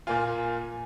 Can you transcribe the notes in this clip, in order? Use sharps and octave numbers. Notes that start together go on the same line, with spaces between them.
A#2 A#3 F4 G#5